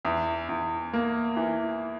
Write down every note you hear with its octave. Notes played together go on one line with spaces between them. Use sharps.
E2
E2
A#3
E3